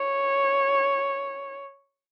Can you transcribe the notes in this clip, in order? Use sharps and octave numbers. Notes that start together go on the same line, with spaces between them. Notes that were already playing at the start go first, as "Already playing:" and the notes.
Already playing: C#5